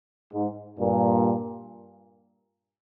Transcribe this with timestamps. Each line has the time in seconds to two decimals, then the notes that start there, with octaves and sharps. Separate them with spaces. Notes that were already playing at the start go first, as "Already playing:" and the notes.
0.34 G#2
0.79 G2 A#2